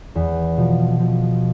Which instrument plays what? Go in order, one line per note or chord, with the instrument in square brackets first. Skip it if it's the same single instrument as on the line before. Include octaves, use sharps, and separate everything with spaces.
[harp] E2
[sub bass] B2 [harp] F3
[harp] F3